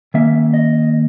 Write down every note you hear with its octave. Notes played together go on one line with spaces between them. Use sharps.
D#3 A#3 C#4 E5
D#5